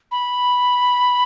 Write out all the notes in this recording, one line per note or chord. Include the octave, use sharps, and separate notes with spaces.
B5